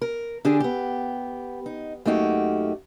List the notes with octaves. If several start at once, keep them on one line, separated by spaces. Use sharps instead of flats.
A#4
D3 D4 G4 G#4
B3 G4
D#4
F#2 A3 A#3 D#4 F#4 G4